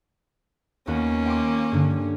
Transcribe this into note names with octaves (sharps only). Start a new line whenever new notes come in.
D#2 A#3 B3 C#4 F#4
G5 C6 D6
G2 D3